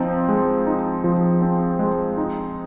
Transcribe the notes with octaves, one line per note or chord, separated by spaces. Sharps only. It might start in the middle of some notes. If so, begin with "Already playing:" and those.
Already playing: F3 C4 D#4
G#3
D#4
F3
C4
G#3
D#4